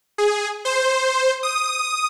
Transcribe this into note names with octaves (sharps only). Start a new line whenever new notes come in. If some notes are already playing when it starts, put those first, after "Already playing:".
G#4
C5
D#6